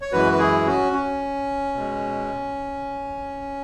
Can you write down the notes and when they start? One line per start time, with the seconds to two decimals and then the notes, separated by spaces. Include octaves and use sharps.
0.01 C#5
0.12 F#2 E3 G#3 F#4 B4
0.32 B4
0.39 E4 G#4
0.66 C#4 F#4
0.93 C#4
1.74 B2 G#3